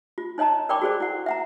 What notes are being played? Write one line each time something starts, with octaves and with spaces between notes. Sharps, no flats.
F4
D#4 C#5 D#5 A5 A#5
A#4 D5 G5 B5 C#6 D6
F#4 G#4 A4 C5 D5
E4 F#5
E5 F#5 A#5